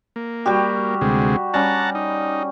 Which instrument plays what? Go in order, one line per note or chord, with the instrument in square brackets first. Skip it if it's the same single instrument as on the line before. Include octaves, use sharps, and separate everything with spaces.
[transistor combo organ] A#3
[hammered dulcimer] G3 F#4 G4
[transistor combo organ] D2 C3 G#3
[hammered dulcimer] G3 C#4 [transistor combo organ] F#5 A5 A#5
[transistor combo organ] D#4